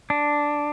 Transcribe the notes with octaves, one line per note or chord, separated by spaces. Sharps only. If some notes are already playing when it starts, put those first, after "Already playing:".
D4